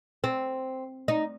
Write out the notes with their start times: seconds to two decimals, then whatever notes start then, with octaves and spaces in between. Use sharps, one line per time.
0.24 C4
1.08 D#4